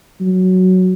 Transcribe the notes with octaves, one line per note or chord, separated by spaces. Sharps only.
F#3